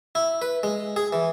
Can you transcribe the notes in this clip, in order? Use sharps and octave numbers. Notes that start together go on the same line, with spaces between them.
E4
B4
G#3
G#4
E3